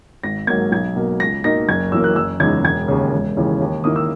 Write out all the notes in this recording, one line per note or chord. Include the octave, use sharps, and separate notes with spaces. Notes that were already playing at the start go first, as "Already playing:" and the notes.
G#1 A#6
G#2 F#3 A#3 G#6
B1 G#6
B2 A#3
C#2 A#6
B2 A#3 D#4 A#6
F#1 G#6
F#2 E3 A#3 E6
F#6
F#1 E6
E2 C#3 G#3 D#4 G#6
E1 G#6
D#2 C#3
E1
D#2 C#3 E3
D#2
D#3 A#3 E4 D#6
E6